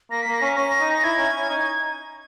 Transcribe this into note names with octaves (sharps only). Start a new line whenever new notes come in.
A#3 A#6
A#3 B6
A#6
C#4 B6
C#4 A#6
D#4
A#6
E4 G#6
C#4
C#4
D#4